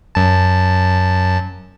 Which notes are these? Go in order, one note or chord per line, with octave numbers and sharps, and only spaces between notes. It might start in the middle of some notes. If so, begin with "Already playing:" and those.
F#2 A5